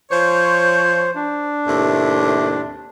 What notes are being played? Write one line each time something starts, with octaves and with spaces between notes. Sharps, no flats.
F3 C5 C#5
D4
D#2 A2 C3